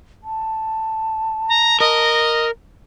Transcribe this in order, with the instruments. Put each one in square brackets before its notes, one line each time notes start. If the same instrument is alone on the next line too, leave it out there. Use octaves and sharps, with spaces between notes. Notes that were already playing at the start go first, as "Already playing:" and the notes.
[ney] A5
[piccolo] A#5
[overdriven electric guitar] A#4 [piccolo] D#5